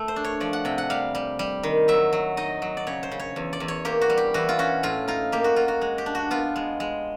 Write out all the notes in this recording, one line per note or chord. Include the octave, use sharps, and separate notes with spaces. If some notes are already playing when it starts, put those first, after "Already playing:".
Already playing: A3
C5
D4
C#5
F3 D5
F#5
C3 G5
F#5
G3 F5
G3
G3
D#3
F#3 E5
F#3
D#4 D#5
F#3
D5
C#3 C#5
C5
C#3
C#5
E2
D5
E2
C#5
A#3 G4
F#4
G3
G4
E3 F#4
F4
C#4 F#4
A2 F4
D#4 F4
A#3 G4
F#4
A#3 F4
F#4
G#3
G4
D4
F#4
B3 F4
G#3
G#3